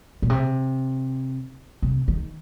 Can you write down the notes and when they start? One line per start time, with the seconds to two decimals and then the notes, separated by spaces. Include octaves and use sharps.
0.22 A#2
0.30 C3
1.82 C3
2.08 D#3